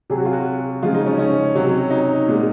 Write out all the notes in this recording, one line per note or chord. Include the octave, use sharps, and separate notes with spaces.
C3 F#3 G#4
F#4
F4
F#4
C#3 F3 G#3 F4
D#4
C#4
C#4
C3 F#3
D#4
A#2 G#3